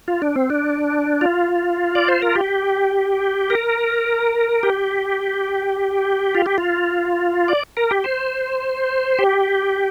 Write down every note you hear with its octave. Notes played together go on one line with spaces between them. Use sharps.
F4
D4
C4
D4
F4
D5
C5
A#4
G4
A#4
G4
F4
G4
F4
D5
A#4
G4
C5
G4